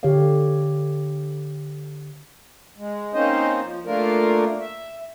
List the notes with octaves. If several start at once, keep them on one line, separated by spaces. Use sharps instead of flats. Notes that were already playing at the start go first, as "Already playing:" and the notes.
D3 G4 A4 C#5 F5
G#3
A#3 C4 C#4 D#4 C5 D#5
F3
A3 A#3 D4 F4 A#4
E5